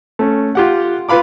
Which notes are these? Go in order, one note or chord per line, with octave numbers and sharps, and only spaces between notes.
A3 C#4
F4 G4 F#5
F4 B4 F5 B5 D6